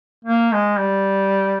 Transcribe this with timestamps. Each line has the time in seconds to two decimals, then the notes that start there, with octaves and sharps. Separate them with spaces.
0.25 A#3
0.52 G#3
0.79 G3